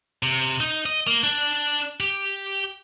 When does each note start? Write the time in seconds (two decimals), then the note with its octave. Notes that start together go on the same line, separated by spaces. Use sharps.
0.23 C3
0.60 D#4
0.86 D#5
1.07 A#3
1.24 D4
2.00 G4